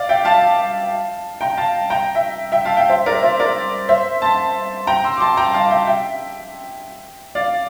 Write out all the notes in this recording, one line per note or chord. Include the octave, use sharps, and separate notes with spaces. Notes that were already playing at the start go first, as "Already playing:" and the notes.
Already playing: D5 F5
E5 G5
F5 A5
G5 A#5
F5 A5
G5 A#5
E5 G5
E5 G5
F5 A5
E5 G5
C5 E5
A#4 D5
C5 E5
A#4 D5
C5 E5
A5 C6
G5 A#5
C6 E6
D6
A5 C6
G5 A#5
F5 A5
E5 G5
E5 G5
D5 F5